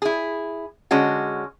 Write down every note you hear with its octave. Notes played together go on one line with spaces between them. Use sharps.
E4 G#4
D3 G#3 C#4 F#4